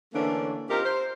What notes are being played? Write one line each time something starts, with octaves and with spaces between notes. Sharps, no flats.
D3 E3 A3 A#3 C#4 D4
C4 D#4 F4 G4 A#4
C5